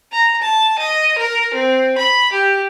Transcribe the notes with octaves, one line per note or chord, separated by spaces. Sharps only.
A#5
A5
D#5
A#4
C4
B5
G4